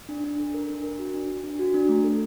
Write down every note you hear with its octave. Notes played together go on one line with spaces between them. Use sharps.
D4
D4
A4
A#4
D4
A#4
F#4
D4
D4
D4
F#4
D4
A3
A4